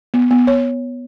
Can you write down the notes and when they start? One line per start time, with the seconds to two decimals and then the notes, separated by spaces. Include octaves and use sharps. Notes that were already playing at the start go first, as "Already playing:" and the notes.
0.14 B3
0.31 B3
0.47 C#5